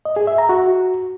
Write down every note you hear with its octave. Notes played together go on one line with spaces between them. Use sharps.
D#5
G#4
E5
A#5
F#4